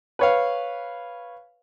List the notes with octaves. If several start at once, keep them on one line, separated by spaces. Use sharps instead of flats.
B4 C#5 F5